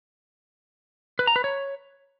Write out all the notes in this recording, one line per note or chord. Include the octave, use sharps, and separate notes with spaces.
B4
A#5
B4
C#5